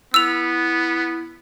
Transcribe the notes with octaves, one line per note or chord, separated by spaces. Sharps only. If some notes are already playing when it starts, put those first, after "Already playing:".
B3 E4 E6 F7